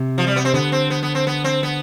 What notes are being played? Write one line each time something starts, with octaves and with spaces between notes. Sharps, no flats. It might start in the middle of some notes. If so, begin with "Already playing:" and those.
Already playing: C3
F3
G3
B3
C4
D3 B3
C4
B3
B3
C4
B3
C4
B3